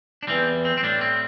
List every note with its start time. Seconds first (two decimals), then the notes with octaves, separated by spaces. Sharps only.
0.23 D4
0.27 E2 E3 G3 C4
0.65 C4
0.77 C4
0.83 A2 G3 D4
1.01 C4